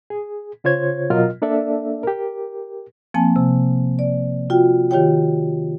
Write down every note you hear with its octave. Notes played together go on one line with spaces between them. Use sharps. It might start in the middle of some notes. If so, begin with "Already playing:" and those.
G#4
C#3 F4 C5 C#5 G#6
B2 F#3 F4 A#4 D#5 F6
A#3 D4 A4 D5 E5
G4 A#4
F3 A#3 C4 G#5 A5
C3
D5
F4 F#4 G5
D#3 F4 G4 C#5 G5